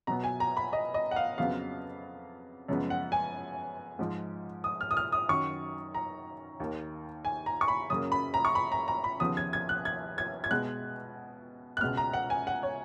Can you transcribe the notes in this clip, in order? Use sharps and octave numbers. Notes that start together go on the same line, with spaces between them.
B2 F#3 B3 A#5
G#5
A#5
B5
D#5
D#5
F#5
F5
F2 C#3 F#3 B3 F5
F#2 C#3 F3 G#3 B3
F#5
G#5
G#2 F3 G#3
D#6
F6
D#6
F6
D#6
F#2 D#3 F#3 C#6
A#5
D#2 D#3 A#3
G#5
A#5
C#6
B5
F#2 C#3 F#3 A#3 D#6
B5
A#5
C#6
B5
A#5
A#5
B5
D#2 C#3 F3 B3 D#6
G#6
G#6
F#6
G#6
G#6
G#6
B2 G#3 B3 F#6
F#6
C#2 B2 G#3 B3 F6
A#5
F#5
G#5
F#5
C#5